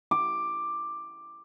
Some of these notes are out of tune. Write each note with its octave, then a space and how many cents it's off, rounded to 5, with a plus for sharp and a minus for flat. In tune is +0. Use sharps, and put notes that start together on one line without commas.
D6 +10